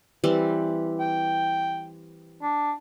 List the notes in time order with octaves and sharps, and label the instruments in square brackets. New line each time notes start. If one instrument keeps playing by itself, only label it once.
[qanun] E3 G3 C4
[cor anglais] G5
D4